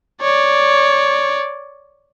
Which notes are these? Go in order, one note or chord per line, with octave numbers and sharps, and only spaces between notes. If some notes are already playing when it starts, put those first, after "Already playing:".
C#5 D5